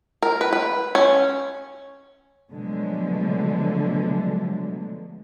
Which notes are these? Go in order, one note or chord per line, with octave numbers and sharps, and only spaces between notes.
A#4
B4
B4
C#4
B2 D3 F3 F#3 G#3 A3